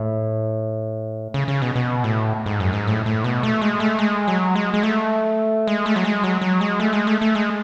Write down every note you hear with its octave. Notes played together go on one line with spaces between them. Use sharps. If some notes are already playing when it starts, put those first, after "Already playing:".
Already playing: A2
C#3
C#3
B2
B2
A2
G#2
F#2
G#2
A2
A2
B2
A3
G#3
A3
G#3
F#3
G#3
G#3
A3
G#3
A3
F#3
G#3
F#3
F#3
G#3
A3
G#3
A3
A3
G#3